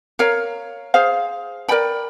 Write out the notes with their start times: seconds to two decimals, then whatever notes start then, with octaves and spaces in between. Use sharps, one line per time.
0.19 A#4 C#5 F5
0.94 G#4 C5 F5
1.68 A#4 D5 G5 B5